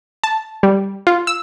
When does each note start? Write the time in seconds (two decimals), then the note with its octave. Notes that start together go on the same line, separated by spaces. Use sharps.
0.24 A5
0.63 G3
1.07 F4
1.27 E6